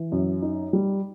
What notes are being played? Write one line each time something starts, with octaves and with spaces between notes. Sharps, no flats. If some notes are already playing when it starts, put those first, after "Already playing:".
Already playing: E3
F#2
D#4
G3